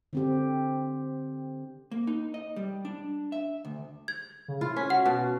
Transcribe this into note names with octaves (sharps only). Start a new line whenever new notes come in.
D3 C4 G4
A#3
D#4
D#5
G3
D4
E5
D2
G#6
C#3
E4 F4
C#4 B6
F#4 F#5
B2